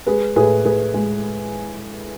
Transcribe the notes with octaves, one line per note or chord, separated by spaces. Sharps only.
G#3 G#4 B4
A2 G#4 B4
A2 G#4 B4
G#3